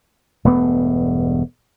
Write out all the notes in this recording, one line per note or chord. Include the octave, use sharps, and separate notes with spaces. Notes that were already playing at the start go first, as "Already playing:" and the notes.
E1 G2 A3 B3